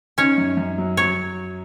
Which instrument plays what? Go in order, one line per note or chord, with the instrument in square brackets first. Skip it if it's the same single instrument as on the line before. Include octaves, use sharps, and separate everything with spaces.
[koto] C#4 C#5 [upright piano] D#4
[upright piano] F#2
F#2
F#3
[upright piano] F#3 [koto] C#5